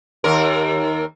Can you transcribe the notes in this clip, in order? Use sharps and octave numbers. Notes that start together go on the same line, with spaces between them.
D#2 A#4